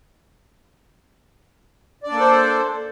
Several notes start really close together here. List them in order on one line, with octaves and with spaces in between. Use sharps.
D5 D4 A#3 A4 C5